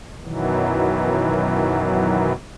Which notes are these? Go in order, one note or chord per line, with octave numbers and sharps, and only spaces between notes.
F#2 B2 D#3 E3 F#3